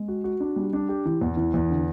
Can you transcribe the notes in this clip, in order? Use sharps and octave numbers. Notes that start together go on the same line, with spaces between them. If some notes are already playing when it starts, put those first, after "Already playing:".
Already playing: G#3
F#4
F#4
D4
G3
D4
G4
E3
E2
E3
E2
D3